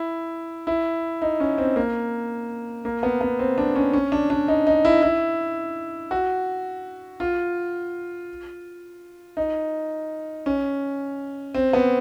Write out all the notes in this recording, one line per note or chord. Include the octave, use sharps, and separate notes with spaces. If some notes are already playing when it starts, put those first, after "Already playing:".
Already playing: E4
E4
D#4
C#4
C4
A#3
A#3
B3
B3
C4
D4
C#4
C#4
D4
D4
D#4
D#4
E4
E4
F#4
F4
D#4
C#4
C4
B3